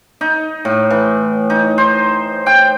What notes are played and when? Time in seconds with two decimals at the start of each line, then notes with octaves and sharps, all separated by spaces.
0.21 D#4
0.65 A2
0.90 E3
1.50 D#4
1.78 C5
2.46 G5